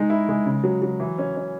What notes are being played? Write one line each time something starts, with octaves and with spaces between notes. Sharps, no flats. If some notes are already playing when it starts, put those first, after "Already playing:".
Already playing: G#3 D#4
E4
G#3
C#3
F#3
F#3
E3
C#4
C#4